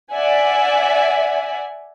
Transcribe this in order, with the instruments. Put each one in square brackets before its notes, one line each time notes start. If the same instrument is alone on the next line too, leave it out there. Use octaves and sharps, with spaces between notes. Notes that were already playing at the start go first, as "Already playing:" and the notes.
[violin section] D5 E5 F#5 G#5